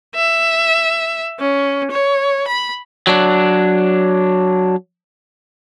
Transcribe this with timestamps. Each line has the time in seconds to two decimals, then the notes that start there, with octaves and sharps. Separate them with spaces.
0.15 E5
1.39 C#4
1.90 C#5
2.47 B5
3.07 F#3 D4